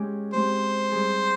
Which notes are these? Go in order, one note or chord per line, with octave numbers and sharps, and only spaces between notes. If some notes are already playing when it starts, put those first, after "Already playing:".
Already playing: G#3 C#4 G4 C#5
G#3 C4 G4 C5
G3 C4 D#4 G#4